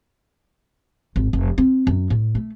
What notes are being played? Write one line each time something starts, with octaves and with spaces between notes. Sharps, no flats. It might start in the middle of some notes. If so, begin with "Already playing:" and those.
G#1
F1
C4
F#2
A2
A3